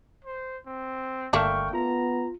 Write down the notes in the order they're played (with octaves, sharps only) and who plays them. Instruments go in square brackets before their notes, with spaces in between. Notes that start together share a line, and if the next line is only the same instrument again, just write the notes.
[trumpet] C5
C4
[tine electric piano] G1 C#6 F6 [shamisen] A3 A#3 D4 [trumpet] G5
[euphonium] B3 [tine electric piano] F4 [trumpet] A#5